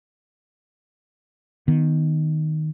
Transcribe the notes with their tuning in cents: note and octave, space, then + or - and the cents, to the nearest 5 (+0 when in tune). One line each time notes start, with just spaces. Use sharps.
D#3 +0 B3 +0